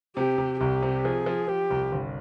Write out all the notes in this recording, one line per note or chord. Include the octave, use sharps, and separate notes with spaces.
C3 G4
C3
C2 G4
C3
F3 G#4
F3
F3 G4
C2
G1